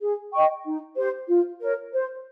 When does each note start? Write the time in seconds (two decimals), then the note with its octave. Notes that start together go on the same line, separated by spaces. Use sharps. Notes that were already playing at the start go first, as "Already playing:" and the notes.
0.01 G#4
0.33 D#5 G5 C#6
0.66 D#4
0.97 G4 C5
1.28 F4
1.61 A#4 C#5
1.92 C5